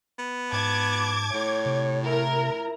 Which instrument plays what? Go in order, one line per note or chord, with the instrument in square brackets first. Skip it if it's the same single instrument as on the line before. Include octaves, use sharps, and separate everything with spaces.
[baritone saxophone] B3
[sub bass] G#2 [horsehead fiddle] A5 [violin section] D6 G#6
[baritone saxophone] A2 [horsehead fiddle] C#5
[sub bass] C3
[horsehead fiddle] E4 A#5 [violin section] A#4